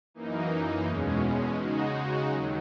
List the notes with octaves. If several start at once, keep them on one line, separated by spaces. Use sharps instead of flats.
F#2 E3 A#3 D#4
E2 B2 G#3 C#4
C#3 G#3 D#4 F#4
D#2 D#3 F#3